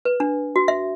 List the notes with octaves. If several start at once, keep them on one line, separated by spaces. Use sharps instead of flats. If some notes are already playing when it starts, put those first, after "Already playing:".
B4
D4
F#4
E5